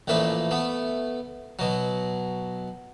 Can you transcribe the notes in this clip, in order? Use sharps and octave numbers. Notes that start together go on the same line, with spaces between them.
A1 A#2 F3 A3 B4
A3 B3
B2 F#3